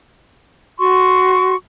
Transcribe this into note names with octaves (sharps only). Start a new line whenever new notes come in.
F#4 C6 C#6